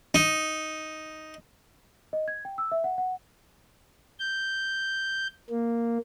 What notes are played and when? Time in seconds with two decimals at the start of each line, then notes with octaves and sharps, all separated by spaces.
0.14 D#4
2.13 D#5
2.28 G#6
2.45 G5
2.58 E6
2.72 E5
2.84 F#5
2.98 F#5
4.20 G6
5.50 A#3